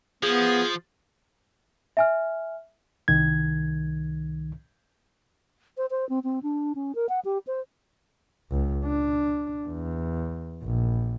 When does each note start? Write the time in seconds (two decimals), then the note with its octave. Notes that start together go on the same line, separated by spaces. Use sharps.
0.23 F3 B3 G#4
1.97 E5 G#5 F6
3.08 C2 D#3 G#6
5.77 C5
5.91 C5
6.09 C4
6.24 C4
6.43 D4
6.75 C#4
6.95 A#4
7.09 F#5
7.25 G4
7.47 C5
8.51 C#2
8.85 D4
9.66 E2
10.63 A#1